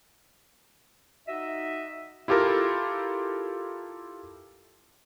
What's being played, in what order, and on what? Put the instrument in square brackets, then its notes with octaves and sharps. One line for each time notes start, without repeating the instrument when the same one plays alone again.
[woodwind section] D#4 F#4 D#5 E5
[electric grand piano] E4 F4 G4 A4 A#4